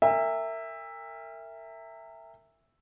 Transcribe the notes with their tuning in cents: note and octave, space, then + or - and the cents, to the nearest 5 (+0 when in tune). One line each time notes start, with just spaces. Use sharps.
A#4 -30 E5 +0 G5 +45